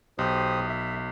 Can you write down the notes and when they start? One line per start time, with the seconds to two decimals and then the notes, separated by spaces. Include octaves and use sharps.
0.19 B1 G4 C5 D#6
0.68 E5